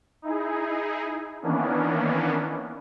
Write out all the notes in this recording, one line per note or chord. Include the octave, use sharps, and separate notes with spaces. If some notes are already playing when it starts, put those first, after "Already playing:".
D#4 E4 G#4
D#3 E3 A#3 B3 C#4 D4